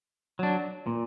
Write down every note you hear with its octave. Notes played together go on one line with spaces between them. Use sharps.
F#3 D4
A#2